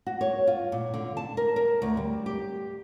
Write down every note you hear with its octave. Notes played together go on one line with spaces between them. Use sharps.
F#4
C#5
F4
A#2
D3
A5
A#4
A#4
D2
G3
G4